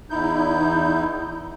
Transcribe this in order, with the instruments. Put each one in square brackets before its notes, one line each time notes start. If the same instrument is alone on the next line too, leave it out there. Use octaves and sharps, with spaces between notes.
[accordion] E2 D#4 E4 G6